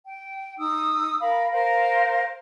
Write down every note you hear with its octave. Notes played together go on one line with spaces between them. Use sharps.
G5
D#4 D#6 E6
A#4 F5 B5
A#4 C5 F5